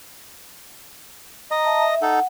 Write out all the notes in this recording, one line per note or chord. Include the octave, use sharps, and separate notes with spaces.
D#5 A#5
E5 A5 A#5
E5
D#4 A4 F#5